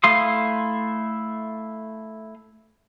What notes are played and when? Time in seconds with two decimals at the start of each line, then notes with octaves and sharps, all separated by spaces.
0.04 A3 E4 F5 C6 D#6